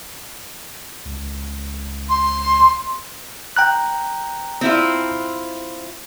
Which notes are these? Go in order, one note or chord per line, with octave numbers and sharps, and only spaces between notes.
C#2
C6
G5 A#5 F#6
C4 E4 F4